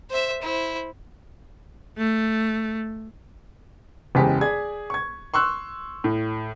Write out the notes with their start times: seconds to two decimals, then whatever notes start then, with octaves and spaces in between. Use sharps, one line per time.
0.10 C5 E5
0.42 E4 C5
1.98 A3
4.15 F#1 E2 C#3 G#3 G4 B6
4.41 G#4 D5 G#6
4.90 C#6 G#6
5.34 C6 C#6 E6 F#6
6.04 A2